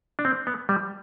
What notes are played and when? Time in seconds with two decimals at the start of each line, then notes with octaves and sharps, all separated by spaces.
0.19 D4
0.25 C4
0.47 B3
0.69 G3